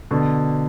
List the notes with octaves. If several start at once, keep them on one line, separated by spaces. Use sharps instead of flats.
B2 D3